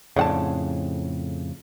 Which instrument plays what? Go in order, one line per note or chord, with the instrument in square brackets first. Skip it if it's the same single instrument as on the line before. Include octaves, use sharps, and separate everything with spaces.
[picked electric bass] F2 A2 C#3 [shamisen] D4 F#5 A5